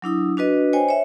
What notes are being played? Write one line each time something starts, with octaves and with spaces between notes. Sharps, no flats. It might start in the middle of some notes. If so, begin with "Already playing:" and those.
F#3 D4 E4 D#6
D4 F#4 B4 D#5
C5 C#5 D#5 G5 G#5
C#5 E5